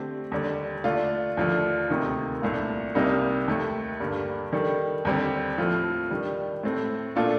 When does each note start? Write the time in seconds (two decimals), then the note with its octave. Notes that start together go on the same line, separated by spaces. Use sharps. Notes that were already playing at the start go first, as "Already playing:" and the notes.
Already playing: D3 A3 C4 G4
0.32 D#2 D3 G3
0.84 D3 A3 D4 F4
1.37 D#2 D3 F3 A3 D4
1.89 D2 C3 D#3 A#3 D#4
2.42 C2 A#2 A3 D4 F4
2.95 C2 C3 G3 A#3 D#4
3.48 D#2 D#3 A3
4.00 G2 D3 G3 A#3
4.53 D#3 G3 D4 A4
5.05 D#2 D3 G3 C4 G4
5.58 A2 F3 A3 C4
6.11 D#3 G3 D4
6.63 A2 A3 C4
7.16 A#2 A3 D4 F4 A4